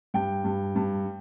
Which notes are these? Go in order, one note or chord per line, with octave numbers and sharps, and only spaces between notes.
G2 G5
G2
G2